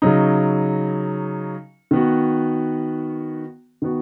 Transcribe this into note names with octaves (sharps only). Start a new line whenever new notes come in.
C#3 F#3 D#4
D#3 B3 F#4
D#3 B3 F#4